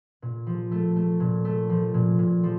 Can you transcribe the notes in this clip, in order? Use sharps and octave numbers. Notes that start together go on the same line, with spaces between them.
A#2
F3
A3
A3
A#2
A3
F3
A#2
A#2
F3